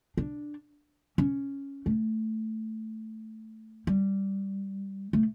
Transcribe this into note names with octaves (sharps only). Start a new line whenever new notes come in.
D4
C#4
A3
G3
A3